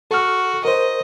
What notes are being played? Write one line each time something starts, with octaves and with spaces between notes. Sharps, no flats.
F#4 A4 F6
A#4 C5 D#5